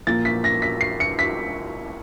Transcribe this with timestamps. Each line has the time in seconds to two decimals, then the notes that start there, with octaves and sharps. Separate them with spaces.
0.07 A#2 F3 A#3 A6
0.25 B6
0.44 A#6
0.62 B6
0.81 C7
1.00 C#7
1.19 B6